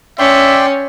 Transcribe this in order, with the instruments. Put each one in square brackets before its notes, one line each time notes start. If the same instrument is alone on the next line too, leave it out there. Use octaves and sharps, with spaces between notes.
[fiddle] C#4 [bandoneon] D5 G5 C6 [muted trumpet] E5